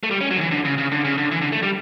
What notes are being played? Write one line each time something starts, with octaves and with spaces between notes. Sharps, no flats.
A3
G3
C#4
F#3
D3
E3
D3
C#3
C#3
D3
C#3
D3
E3
D3
A3
G3